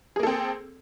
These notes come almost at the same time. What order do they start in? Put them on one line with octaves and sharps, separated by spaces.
G#4 A#3 A4 C4